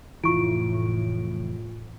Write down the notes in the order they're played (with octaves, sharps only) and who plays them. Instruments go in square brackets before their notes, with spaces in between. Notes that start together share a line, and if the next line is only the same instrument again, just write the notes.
[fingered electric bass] F1 E3 [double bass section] A2 [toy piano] E4 C#6 [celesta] F4 D7